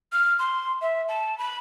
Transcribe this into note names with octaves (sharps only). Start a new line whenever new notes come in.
F6
C6
E5
A5
B5